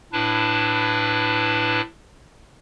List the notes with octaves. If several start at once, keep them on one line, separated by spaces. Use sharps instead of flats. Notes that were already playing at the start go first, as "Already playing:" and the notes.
A2 D4 E4 B4 A5